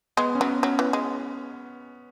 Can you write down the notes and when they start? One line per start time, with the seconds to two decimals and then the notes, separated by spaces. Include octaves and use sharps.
0.17 G#3 B3
0.35 C#4
0.41 F#3 B3
0.63 F#3 C#4
0.79 E3
0.93 G#3